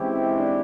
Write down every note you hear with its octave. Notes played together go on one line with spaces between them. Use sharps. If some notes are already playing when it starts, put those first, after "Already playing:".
Already playing: E3 G#3 C4 C#4 E4 G4
D4